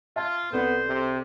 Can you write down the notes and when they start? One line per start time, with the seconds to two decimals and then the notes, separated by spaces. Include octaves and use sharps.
0.16 F4 E5 A5 G#6
0.52 C2 B3 A4 C5 D5
0.88 C3